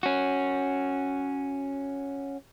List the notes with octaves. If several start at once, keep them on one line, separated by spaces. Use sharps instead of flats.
C#4 F#4